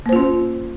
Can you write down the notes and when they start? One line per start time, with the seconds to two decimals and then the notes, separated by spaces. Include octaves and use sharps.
0.06 A#3
0.09 C5
0.13 F4
0.16 C#4